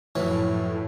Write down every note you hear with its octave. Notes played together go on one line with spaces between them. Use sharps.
F#2 A2 E3 F3 E4 C#5